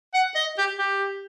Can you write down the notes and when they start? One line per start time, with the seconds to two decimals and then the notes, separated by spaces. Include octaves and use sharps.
0.14 F#5
0.35 D#5
0.58 G4
0.78 G4